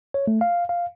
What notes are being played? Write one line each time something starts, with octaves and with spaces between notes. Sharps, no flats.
C#5
A3
F5
F5